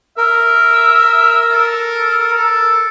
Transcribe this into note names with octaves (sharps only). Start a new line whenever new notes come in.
A#4 E5
A4
A4